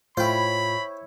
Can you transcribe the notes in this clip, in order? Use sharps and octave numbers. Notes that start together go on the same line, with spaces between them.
A2 E4 F4 C5 C#5 G5 B5